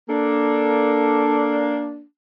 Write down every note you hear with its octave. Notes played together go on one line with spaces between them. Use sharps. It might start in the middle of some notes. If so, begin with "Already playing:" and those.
A#3 D4 A4